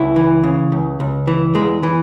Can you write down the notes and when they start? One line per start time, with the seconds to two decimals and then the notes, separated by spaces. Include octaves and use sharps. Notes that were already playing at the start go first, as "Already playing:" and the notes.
Already playing: C#2 E4
0.16 E3
0.44 C#3
0.72 C#2
1.00 C#2
1.27 E3
1.55 E2 G#3
1.83 E3